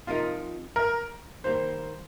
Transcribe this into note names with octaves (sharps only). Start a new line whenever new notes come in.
C3 F3 D#4 F4 A#4
A#4
D#3 G3 A#3 C5